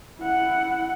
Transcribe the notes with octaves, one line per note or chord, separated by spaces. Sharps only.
E4 F#5